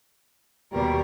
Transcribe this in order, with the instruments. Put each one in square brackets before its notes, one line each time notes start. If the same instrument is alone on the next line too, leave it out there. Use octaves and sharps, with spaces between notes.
[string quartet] D#2 B2 A#4 [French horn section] G3